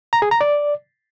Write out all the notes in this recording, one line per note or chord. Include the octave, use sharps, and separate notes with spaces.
A#5
G#4
A#5
D5